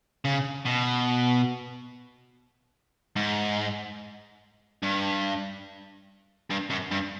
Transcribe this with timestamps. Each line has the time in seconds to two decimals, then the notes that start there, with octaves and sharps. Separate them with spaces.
0.25 C#3
0.66 B2
3.16 G#2
4.83 G2
6.50 G2
6.71 F#2
6.92 G2